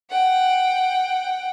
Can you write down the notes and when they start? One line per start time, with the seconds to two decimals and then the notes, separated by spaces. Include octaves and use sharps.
0.10 F#5 G5